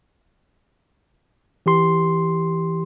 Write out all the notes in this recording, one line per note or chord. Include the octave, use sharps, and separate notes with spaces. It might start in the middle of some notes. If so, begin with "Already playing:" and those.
E3 G4 C6